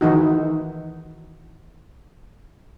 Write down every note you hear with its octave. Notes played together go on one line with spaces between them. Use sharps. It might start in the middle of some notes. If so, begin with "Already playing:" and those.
D#3 E3 D#4 F#4